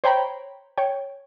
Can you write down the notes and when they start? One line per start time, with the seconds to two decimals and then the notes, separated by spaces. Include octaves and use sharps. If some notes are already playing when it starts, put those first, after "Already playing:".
0.04 C5 C#5 G5 A#5 B5
0.78 C#5 G5